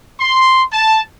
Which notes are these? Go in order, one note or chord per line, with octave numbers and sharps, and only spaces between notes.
C6
A5